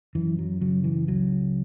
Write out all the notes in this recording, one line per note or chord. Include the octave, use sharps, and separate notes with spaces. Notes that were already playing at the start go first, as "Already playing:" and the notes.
F#2 E3
F#3
C#3 F#3
E3
C#2 F#3